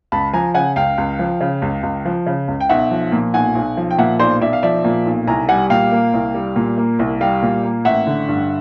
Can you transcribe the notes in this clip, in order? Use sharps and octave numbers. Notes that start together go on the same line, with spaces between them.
C#2 A5 B5
F3 G#5 A#5
C#3 F#5 G#5
C#2 F5 G5
C#2
F3
C#3
C#2
C#2
F3
C#3
C#2
G5
B1 E5 F#5
F3
A#2
B1 F#5 G#5
B1
F3
G5
A#2 E5 F#5
B1 C5 D5
B1 D5 E5
F5
F3 D5 E5
A#2
B1
C2 G#5 A#5
G3 F#5 G#5
A#2 F5 G5
A#3
C2
G3
A#2
A#3
C2
G3 F5 G5
A#2
A#3
A1 E5 F#5
D3
G2